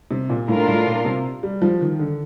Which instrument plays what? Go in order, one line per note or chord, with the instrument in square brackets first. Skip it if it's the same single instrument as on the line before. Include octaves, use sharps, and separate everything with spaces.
[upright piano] C3
A#2
[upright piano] A2 [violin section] D4 F4 A#4
[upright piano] A2
A#2
C3
G3
F3
D#3
D3